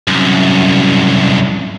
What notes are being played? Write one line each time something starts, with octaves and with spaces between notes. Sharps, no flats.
C2 F#2